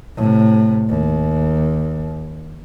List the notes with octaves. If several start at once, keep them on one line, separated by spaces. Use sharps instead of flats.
A2 C3
D#2